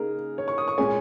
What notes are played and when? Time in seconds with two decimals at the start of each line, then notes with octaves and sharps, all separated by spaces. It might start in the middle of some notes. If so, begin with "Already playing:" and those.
Already playing: C#3 A#3 D#4 G#4 A#4
0.38 C#5
0.48 C#6
0.58 D#6
0.68 C#6
0.78 A#2 G#3 C#4 G#5